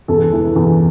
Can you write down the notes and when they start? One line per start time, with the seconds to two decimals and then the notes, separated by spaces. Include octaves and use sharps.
0.08 E2 A4
0.32 E3
0.56 E2